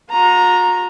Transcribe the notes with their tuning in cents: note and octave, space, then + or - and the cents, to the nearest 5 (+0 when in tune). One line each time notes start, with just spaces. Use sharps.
F#4 -45 A#5 +0